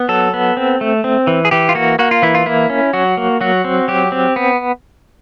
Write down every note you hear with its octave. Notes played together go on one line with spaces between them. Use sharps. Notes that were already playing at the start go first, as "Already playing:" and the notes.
Already playing: B3
F#3 A4
B3
C4
A3
C4
E3
G#4
E3 G4
F4
A#3 F#4
A#3 F#4
F4
E3 E4
F4
A#3 E4
C#4
F#3 F#4
A#3
F#3 F#4
C4
F#3 G4
C4
B3